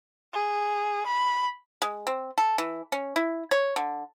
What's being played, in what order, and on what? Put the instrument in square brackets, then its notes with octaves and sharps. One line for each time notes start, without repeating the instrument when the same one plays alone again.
[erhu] G#4
B5
[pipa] G#3
C4
A4
E3
C#4
E4
C#5
D3